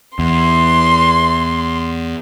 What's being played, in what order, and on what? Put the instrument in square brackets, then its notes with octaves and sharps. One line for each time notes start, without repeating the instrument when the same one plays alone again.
[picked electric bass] E2 [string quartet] C6